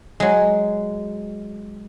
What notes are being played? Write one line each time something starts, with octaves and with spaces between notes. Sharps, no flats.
F#3 G#3